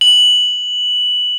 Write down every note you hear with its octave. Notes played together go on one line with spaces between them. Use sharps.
F#7